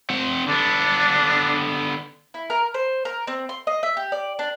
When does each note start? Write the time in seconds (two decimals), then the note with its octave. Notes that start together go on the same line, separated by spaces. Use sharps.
0.10 C4 F#5
0.48 D3 B3 D4
2.34 E4
2.50 A#4
2.74 C5
3.05 A#4
3.27 C4
3.49 C6
3.67 D#5
3.83 E5
3.97 G4
4.12 D5
4.39 D4